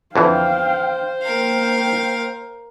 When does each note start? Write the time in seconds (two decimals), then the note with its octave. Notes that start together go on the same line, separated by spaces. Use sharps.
0.16 F2 D3 E3 C5 F5 G5
1.23 A#3 A#4 F5 G5